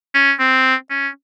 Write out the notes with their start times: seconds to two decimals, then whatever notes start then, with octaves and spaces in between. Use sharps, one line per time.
0.15 C#4
0.40 C4
0.90 C#4